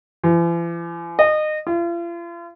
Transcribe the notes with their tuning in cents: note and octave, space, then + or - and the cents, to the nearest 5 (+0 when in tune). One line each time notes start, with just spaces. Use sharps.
E3 +45
D#5 -25
F4 -40